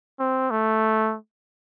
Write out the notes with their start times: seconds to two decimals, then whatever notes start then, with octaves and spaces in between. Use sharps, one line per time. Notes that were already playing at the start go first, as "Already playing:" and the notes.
0.20 C4
0.51 A3